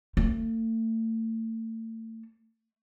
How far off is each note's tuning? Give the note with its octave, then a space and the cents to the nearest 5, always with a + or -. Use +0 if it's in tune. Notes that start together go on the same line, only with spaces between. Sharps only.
A3 +35